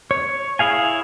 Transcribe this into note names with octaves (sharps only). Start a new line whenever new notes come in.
C#5
E4 G#4 F5 G#5